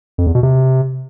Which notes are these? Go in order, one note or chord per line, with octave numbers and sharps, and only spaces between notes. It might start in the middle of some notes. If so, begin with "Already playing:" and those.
F2
E2
B2
C3